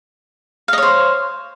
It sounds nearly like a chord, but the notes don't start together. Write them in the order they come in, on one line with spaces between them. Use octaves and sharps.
F5 D#5 C#5 C5